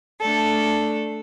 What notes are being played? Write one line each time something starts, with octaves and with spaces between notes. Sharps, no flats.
A3 D4 A4